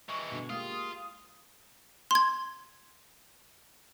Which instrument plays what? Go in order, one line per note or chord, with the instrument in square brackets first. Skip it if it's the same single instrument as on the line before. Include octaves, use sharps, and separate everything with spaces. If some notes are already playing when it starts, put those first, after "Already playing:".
[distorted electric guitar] E3 G#3 [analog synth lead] C#6
[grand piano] B2 D3
[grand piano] G#3 A#3 G4 [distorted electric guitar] F4 [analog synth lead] D#6
[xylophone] C6 G#6